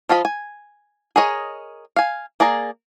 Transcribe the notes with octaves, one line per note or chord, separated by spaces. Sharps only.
F3 F4 D#5 B5
G#5
G#4 A#4 C#5 D#5
F5 G#5
A#3 G#4 D5 A#5